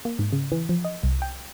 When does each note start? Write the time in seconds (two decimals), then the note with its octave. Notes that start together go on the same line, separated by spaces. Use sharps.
0.05 A#3
0.19 G#2
0.32 C#3
0.52 E3
0.69 F3
0.85 D#5
1.03 C2
1.22 G5